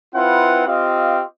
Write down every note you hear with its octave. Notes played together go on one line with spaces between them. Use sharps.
C4 E4 F4 B4 F#5
C4 F4 G4 D#5 F5